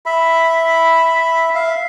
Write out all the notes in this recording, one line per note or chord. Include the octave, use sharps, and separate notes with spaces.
E5 B5
E5 F5